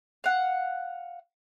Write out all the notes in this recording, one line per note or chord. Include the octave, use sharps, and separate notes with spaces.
F5 F#5